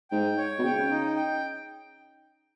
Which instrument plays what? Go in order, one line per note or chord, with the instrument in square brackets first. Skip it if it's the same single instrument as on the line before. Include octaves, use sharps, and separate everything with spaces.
[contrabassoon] G#2 [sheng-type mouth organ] G5
[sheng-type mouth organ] C#5
[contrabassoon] B2
[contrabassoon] C#3 [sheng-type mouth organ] G5
[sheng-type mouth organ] D#4
G5